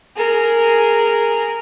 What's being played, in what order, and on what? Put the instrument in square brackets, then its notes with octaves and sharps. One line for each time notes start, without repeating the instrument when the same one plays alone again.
[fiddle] G#4 A#4